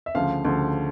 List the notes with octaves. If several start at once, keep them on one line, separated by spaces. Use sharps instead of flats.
E5
D2 C#3 F3 F5
D2 C#3 F3